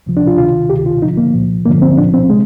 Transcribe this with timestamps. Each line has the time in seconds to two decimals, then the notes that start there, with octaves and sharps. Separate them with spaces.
0.06 D2 C3 F3
0.17 D4
0.27 F4
0.38 D2 C3 D#3 F4
0.70 D2 C3 D#3 G4
0.86 F4
1.02 D#2 D3 F3 D#4
1.17 A#3
1.34 C2 A#2 F3
1.66 G2 D3 F3 A#3
1.82 C4
1.97 C2 A#2 F3 D4
2.13 C4
2.30 C3 G#3